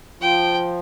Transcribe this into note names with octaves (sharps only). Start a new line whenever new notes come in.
F3 G5